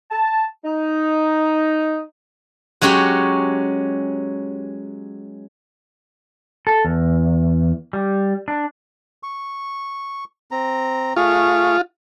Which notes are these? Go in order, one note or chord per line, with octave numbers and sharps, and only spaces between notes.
A5
D#4
F#3 G#3 C#4 G4 C#5
A4
E2
G3
D4
C#6
C4 A#5
A3 F4 G#4 C#6